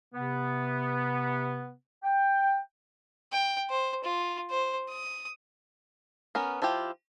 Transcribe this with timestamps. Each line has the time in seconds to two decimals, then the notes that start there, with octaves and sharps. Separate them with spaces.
0.14 C3 B3
2.04 G5
3.32 G5
3.70 C5
4.04 F4
4.50 C5
4.89 D#6
6.35 B3 C#4 A#4
6.62 F3 E4 F4 G4